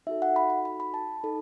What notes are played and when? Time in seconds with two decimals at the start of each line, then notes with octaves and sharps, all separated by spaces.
0.07 D#4 F#4 A4 E5
0.22 F#5
0.36 B5
0.50 B5
0.65 B5
0.80 B5
0.94 A5
1.23 D#4 A4